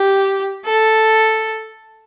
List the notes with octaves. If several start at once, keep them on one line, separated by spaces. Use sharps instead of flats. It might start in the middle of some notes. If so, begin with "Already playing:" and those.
Already playing: G4
A4